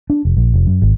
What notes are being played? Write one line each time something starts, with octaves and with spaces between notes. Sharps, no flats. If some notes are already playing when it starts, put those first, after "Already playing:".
D4
F1
A#1
F1
F#2
G#1